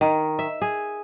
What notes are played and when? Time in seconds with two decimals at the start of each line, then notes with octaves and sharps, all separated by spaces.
0.01 D#3
0.39 E5
0.61 G#4